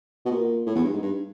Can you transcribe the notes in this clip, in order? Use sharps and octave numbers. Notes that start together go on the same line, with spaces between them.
B2
A#2
A2
E2
G2
G#2
G2